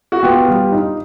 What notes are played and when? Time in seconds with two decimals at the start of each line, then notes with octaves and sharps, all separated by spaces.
0.12 F#4
0.23 B3 F4 G4
0.48 G3
0.72 D#4